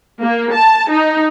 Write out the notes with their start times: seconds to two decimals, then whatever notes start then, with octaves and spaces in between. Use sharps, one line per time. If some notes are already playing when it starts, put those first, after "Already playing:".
0.22 A#3
0.53 A5
0.90 D#4